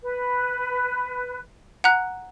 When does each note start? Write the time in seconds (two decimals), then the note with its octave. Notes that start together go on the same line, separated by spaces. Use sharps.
0.03 B4
1.84 F#5 A#5 F#6